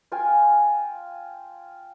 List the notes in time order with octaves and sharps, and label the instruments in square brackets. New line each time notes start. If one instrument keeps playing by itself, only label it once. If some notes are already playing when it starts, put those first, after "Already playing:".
[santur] F4 F5 G5 G#5